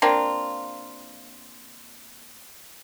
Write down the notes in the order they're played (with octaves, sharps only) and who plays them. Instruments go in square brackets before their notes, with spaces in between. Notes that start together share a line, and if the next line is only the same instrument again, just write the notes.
[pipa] A#3 C4 D4 F4